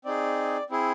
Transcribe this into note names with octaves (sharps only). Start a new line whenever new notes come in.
C4 D#4 G#4 D5
C4 E4 G#4